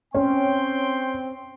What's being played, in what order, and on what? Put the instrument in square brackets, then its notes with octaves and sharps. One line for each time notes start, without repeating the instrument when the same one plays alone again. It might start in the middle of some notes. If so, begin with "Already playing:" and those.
[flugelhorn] C4 [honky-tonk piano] C#4 [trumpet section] G5 C6